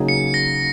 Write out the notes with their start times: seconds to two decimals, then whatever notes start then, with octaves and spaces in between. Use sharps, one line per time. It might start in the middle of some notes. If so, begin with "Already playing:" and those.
Already playing: C#3 F#3 A#3 D#4 G#4
0.09 C#7
0.34 A#6